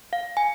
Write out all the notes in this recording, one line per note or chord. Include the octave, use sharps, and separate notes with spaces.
F5
G#5